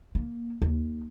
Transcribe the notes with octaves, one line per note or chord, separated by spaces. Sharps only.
A#3
D#2